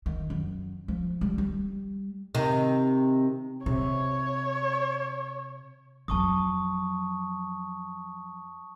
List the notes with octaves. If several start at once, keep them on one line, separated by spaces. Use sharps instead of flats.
D#3
F#2
F3
G3
G3
C3 D#3
C3 C#5
F2 F#3 A5 C#6 D#6